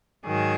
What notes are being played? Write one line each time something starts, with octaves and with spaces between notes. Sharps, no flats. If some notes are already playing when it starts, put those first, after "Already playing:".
G#2 D#3 F#3 G#4